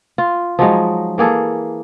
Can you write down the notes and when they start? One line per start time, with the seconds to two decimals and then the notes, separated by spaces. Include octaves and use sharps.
0.18 F4
0.59 F3 F#3 G#3 D#4
1.18 E3 A#3 G#4 A4